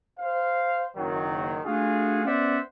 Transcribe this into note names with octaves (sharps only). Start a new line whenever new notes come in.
C5 F5
F#1 D#3 F#3
A3 D4 F4 F#4 G#4
B3 C#4 C5 D5 E5 F#5